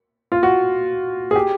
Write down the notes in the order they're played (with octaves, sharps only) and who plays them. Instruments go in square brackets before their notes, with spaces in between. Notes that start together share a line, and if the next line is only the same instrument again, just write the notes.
[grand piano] F4
F#4
G#4
G4